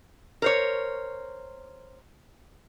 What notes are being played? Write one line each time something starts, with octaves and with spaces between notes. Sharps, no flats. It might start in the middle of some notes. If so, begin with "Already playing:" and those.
A#4 C5 C#5